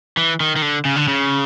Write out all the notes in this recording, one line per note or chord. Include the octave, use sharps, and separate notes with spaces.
E3
D#3
D#3
D3
C#3
D3
C#3